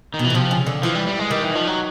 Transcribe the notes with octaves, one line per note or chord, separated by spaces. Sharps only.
D#3
B2
E3
B2
C3 F3
C#3
D3
E3 F3
G3
G3
G#3
D#3 G3
E3
F3
F#3